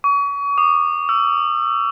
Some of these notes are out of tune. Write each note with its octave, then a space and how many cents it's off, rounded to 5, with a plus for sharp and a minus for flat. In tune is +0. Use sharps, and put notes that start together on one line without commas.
C#6 +35
D#6 -40
E6 +25